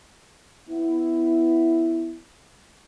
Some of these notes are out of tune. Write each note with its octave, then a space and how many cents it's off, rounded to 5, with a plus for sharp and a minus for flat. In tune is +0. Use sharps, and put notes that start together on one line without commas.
B3 +15 E4 +0